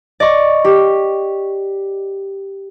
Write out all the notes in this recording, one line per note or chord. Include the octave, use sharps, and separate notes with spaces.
D5 D#5 C#6
G4